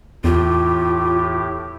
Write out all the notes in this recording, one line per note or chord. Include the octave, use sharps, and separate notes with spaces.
E2 A2 F4 G4